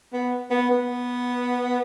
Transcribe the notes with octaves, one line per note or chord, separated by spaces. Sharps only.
B3
B3
B3